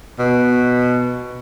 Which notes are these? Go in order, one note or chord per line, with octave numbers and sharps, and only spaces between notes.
B2